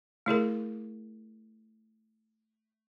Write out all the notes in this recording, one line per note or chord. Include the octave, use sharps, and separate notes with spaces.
A3 E4 G#4 A#4